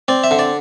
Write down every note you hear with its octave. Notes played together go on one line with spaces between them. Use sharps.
C4 D5
E5
D3
D5